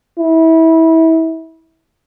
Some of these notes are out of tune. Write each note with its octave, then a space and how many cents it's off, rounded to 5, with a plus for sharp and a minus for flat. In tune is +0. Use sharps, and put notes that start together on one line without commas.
E4 -25